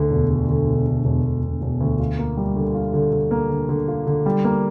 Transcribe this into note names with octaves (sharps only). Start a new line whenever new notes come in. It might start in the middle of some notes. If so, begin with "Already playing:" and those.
Already playing: D2 D3
E1
D3
D3
E1
D3
E1
E1
E1
E1
D2
F4
A#3
G3
D3
F4
D3
D3
A#3
D3
D3
F4
D3
G3
A#3